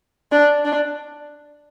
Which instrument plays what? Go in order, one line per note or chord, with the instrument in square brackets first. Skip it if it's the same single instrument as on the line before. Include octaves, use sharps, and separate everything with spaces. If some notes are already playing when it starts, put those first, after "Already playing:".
[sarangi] D4
D4